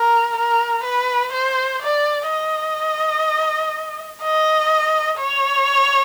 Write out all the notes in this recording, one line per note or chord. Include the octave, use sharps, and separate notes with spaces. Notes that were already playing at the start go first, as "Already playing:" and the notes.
Already playing: A#4
A#4
B4
C5
D5
D#5
D#5
C#5